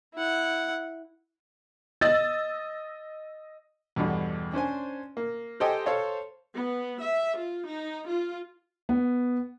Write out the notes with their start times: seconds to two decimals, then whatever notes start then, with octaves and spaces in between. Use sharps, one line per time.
0.14 E4 F#5
2.01 D#5 E6 A6
3.96 E2 G2 B2 D3
4.53 C#4 D4 C5 G#5
5.17 A#3
5.60 G4 A4 C5 D#5 G5 G#5
5.86 A4 C5 C#5 F5 A5
6.56 B3
7.02 E5
7.37 F4
7.68 D#4
8.07 F4
8.89 B3